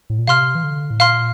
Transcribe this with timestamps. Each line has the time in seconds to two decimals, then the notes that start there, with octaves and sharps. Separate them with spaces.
0.10 A2
0.19 A#2
0.27 C3 F5 C6 F6
0.55 E3
0.64 D3
0.90 A2
1.00 A#2 F5 C6 F6